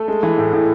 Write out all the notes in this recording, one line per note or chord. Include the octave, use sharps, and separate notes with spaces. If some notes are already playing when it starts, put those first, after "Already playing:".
Already playing: A3 A4
G#3
E3
A2
A2